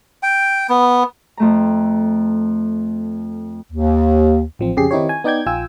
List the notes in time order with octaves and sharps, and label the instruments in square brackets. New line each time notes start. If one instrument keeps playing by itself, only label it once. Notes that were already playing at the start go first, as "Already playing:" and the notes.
[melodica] G5
B3
[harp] F2 A3 A#5
[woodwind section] D#2
[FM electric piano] A1 F3 C4
F2 C#3 G4 G#4 C7
D#3 C4 D#4 E4 G4 C#5
G#5
B3 D#4 D5 G5 G6 G#6
A#1 F4 G5 G#5 E6